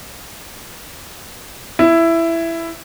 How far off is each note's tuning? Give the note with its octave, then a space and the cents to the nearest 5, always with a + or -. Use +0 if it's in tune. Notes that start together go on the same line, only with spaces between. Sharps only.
E4 +10